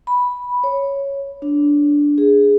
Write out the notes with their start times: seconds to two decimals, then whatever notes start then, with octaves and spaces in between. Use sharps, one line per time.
0.07 B5
0.64 C#5
1.42 D4
2.18 G#4